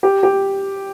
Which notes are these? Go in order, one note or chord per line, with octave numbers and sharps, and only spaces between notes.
G4
G4